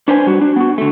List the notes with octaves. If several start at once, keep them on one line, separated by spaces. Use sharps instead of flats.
D4 B4 C5 G#5
G3 F#4
D4
B3 F#4
D3 A3